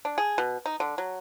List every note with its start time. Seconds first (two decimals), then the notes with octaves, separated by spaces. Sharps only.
0.05 D4
0.18 G#4
0.38 B2
0.66 D#4
0.80 D3
0.98 F#3